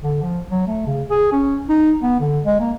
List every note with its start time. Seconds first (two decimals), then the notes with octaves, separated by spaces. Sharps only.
0.02 D3
0.22 F3
0.51 F#3
0.67 A3
0.87 C#3
1.10 G#4
1.32 C#4
1.69 D#4
2.02 B3
2.20 D3
2.45 G#3
2.60 A#3